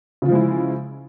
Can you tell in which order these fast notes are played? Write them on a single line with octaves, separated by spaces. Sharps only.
C#3 F4 F3 G#3 E4